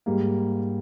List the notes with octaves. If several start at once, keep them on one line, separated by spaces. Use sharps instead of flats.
G#2 G3 A#3